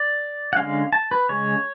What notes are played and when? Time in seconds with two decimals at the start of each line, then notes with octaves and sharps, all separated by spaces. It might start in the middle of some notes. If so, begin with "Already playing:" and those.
Already playing: D5
0.53 F#5
0.57 D3 G#3 C#4 F5
0.93 A5
1.11 B4
1.29 C#3 G#3 C#4 C#5